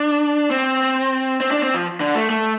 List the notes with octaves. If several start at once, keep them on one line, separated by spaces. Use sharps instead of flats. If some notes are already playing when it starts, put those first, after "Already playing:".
Already playing: D4
C4
C4
D4
C4
F3
D3
A3
A3